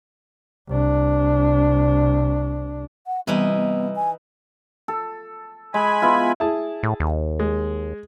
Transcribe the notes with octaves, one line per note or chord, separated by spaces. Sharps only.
C2 D4
F#5
C2 E3 B3 D#4 E4
B3
G#5
A4
G#3 G#5 B5
B3 E4 F4
E4 G#4 A5
A2
D#2
G#3